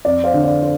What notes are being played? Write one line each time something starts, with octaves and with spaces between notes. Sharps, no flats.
F2 D5
C5 F5
D3
D5
C5